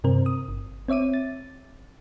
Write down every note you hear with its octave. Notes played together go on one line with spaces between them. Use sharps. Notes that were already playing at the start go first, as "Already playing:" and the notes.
G2 C3 C4 A#4 C5
D#6
G1
C4 C#5 E5 D6 D#7
A6